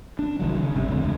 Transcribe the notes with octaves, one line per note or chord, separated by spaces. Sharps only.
D4
C2 D#3 F#3
C#3
G#1 C3 G3
E1 C#2 D3